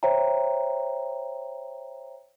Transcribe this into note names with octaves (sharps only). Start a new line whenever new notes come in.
C5 C#5 E5 G5 A#5